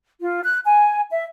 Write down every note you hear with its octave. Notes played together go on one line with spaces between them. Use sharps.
F4
F#6
G#5
E5